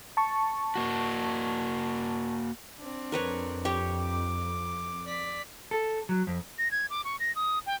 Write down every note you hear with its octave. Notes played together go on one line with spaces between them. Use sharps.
A5 C#6
A#3 F#4
C4 D4
F2 A#4 B4 C#5
G4 C#5 G5
D6
D5 B6
A4
F#3
F2
A#6
G#6
D6
C#6
A#6
D#6
G5